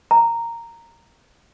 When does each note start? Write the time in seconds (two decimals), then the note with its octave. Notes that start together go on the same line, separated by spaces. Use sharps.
0.11 A#5